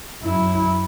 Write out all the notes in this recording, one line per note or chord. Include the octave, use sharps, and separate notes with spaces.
F#2 E4